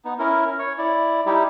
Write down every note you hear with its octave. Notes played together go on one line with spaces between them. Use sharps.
B3 D#4
C#4 E4 A#4
C#5
E4 D5
G3 D#4 E4 G4